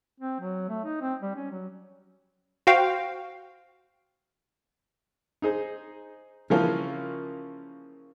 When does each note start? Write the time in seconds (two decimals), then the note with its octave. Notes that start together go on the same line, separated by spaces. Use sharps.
0.20 C4
0.40 F#3
0.69 A3
0.85 D#4
1.01 C4
1.22 G3
1.35 C#4
1.51 F#3
2.67 F#4 C5 F5 G5
5.42 D#4 G#4 C5
6.50 C#3 E3 F3 A#3 C#4 F4